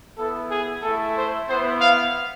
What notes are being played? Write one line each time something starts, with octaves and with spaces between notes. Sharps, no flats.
B3 E4 A4
G#4
A3 E4 A4
C5
B3 E4 C5
F5